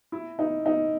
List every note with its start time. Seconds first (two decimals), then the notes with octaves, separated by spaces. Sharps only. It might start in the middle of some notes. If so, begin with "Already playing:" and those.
0.12 E4
0.39 D#4
0.66 D#4